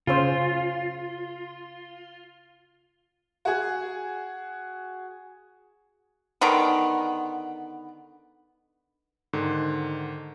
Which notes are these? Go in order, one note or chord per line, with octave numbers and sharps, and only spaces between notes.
C#3 C#4 F4 C5
F#4 G#4
D3 D#3 B3 A#5
G#2 D3 D#3